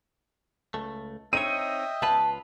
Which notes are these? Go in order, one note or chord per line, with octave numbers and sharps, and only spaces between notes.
C#2 A3
C4 D#4 C#5 D#5 E5 G5 D#7
C#2 F4 B4 A5